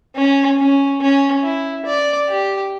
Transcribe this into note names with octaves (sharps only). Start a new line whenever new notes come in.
C#4
C#4
C#4
E4
D5
G4